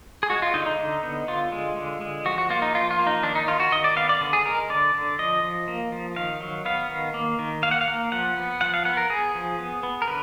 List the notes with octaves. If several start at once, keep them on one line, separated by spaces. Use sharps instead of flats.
G#4
G#3 F#4
F4
D3 D#4
D#4
D3
B3
D3 F4
G#3
D3
G#3
F3 F#4
F#4
A#3 F4
D#4
F3 F4
F4
A#3
D#4
D#3 D4
D#4
D#3 F4
F#4
D#3 D#5
D5
B3 F5
D5
D3
G#4
G#3 A#4
D3 D5
D3
F3 D#5
F3
A#3
F3
D#3 F5
F#3
B3 F5
D#3
A#3
D#3
A#3 F5
F#5
F5
A#3
F3 F#5
B3
F3 F#5
F5
B3 F#5
A#4
B3 G#4
F3
B3
B3
A#4
D3 B4